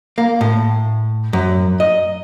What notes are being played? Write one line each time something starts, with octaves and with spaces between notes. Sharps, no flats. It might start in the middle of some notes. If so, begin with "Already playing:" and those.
A#3
A2
F#2
D#5